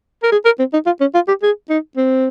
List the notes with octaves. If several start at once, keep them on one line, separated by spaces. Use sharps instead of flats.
A#4
G#4
A#4
C4
D#4
F4
C#4
F4
G4
G#4
D#4
C4